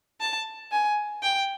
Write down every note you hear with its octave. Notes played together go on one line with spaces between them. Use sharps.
A5
G#5
G5